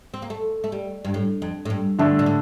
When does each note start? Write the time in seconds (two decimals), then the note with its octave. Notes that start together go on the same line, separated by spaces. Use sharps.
0.14 C4
0.22 A#3
0.30 A3
0.64 A3
0.72 G3
1.05 G2
1.14 A2
1.42 F2
1.65 A2
1.70 G2
1.99 G2 D3 A3 D4
2.19 A#2
2.26 A2